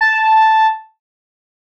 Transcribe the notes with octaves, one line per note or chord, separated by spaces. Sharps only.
A5